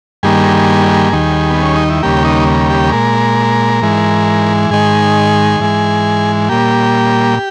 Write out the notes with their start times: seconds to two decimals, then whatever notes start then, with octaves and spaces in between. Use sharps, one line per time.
0.23 G2 D#3 G3 A#3 G#4
1.13 D#2 D#3 G3
1.50 B3
1.63 C#4
1.76 D#4
1.90 E4
2.03 D#2 C#3 G3 A#3 G4
2.25 D#4
2.70 G4
2.92 A#2 G#3 A#4
3.81 G#2 E3 G#3
4.70 G#2 D#3 G#3 G#4
5.60 G#2 E3 G#3
6.49 A#2 G3 A#3 G4